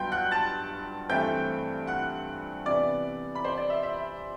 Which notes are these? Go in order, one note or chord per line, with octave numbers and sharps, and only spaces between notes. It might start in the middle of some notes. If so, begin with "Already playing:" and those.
Already playing: G2 F#3 B3 G5 C6 G6
F#5 F#6
A5 A6
G2 E3 A3 C4 G5 G6
F#5 F#6
C3 E3 B3 D5 D6
B5
C5 C6
D5
E5
E5